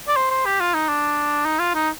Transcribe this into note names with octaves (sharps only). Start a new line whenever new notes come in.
D5
C5
C5
G4
F4
D#4
D4
D#4
F4
D#4